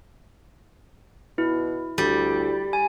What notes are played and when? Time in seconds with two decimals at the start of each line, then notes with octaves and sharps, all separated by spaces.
1.38 B2 E4
1.98 D2 G3
2.73 G#5